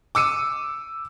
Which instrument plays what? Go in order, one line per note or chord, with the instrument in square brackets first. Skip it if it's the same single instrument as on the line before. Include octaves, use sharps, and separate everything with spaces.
[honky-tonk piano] D6 E6 C#7 D#7